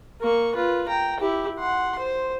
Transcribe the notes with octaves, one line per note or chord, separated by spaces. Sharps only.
A#3 C#6
F4 B4
G5 A#5
E4 G4
F#5 C6
C5